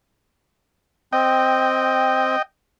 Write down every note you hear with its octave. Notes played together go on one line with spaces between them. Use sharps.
C4 D#5 G5